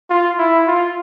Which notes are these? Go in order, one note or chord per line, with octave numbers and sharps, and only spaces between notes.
F4
E4
F4